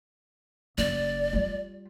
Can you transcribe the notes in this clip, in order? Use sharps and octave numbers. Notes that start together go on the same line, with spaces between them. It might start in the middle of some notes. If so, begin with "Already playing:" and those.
F#1 D5
G3 F4